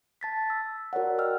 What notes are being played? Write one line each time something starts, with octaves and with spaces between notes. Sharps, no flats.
A5 A6 B6
E6
F#4 A#4 C#5 D5 F#5
D#5 G5 E6 F6